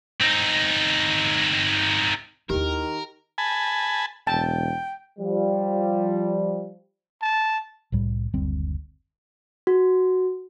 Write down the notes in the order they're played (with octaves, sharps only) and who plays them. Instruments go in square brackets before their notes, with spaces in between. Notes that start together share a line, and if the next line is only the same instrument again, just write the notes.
[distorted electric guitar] C4 D#4
[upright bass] D#2 E4 [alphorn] D#3 [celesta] G4 [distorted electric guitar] A#4
[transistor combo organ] G#5 A5 B5
[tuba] E1 [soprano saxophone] G5 [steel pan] A5
[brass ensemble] F3 G3
[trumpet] A5
[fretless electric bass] C2 A2 G3
F#1 D2 G3 C4
[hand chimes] F#4